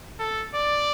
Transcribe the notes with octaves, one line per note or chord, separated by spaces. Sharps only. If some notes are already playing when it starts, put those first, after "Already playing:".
A4
D5